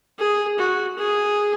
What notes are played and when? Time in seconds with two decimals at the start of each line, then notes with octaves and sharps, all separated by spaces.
0.19 G#4
0.58 F#4
0.98 G#4